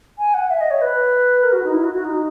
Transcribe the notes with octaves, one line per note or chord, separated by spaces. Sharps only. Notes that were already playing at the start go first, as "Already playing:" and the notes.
G#5
F#5
E5
D#5
C#5
B4
A#4
F#4
D#4
E4
F#4
F#4
D#4